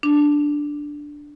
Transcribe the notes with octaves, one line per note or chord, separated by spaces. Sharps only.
D4